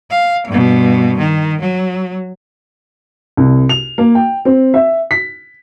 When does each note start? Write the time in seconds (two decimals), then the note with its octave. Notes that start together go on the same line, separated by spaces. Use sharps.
0.10 F5
0.47 G2 B2
1.18 D#3
1.61 F#3
3.37 C2
3.69 F7
3.98 A#3
4.15 G5
4.45 C4
4.74 E5
5.11 B6